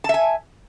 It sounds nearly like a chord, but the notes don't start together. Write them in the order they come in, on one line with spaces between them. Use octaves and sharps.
A5 E5 G#5